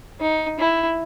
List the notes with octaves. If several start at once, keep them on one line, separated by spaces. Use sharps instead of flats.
D#4
E4